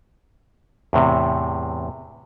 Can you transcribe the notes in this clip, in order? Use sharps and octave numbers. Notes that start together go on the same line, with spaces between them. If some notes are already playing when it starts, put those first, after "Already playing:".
E2 A2 C3